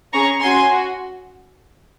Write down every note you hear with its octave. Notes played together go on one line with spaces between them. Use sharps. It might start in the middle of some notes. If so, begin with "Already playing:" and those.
C#4 G#4 A#5 C#6
C#4 F#4 G#5 C6
F#4